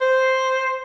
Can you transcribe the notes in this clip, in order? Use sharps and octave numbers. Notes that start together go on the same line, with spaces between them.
C5